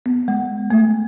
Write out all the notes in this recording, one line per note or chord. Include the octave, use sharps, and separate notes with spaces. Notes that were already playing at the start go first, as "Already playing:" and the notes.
B3
G#3
A3